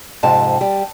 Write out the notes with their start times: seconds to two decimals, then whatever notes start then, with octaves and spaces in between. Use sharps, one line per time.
0.23 F2 G#2 C3 A5
0.61 G3